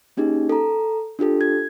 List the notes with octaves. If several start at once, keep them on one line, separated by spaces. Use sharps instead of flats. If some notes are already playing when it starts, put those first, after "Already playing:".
A#3 C#4 D#4 G4 G#4
A4 A#5
D4 F4 G4 A4
G#6